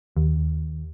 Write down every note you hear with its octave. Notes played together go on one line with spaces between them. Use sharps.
D#2